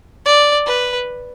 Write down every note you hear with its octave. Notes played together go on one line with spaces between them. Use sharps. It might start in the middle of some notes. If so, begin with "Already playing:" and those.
D5
B4